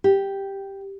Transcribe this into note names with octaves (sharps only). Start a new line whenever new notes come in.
G4